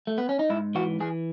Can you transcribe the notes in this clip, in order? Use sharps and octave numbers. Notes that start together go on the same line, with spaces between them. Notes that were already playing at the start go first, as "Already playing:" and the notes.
A3
B3
C#4
D#4
G#2 E4
E3 F#4
E3 G#4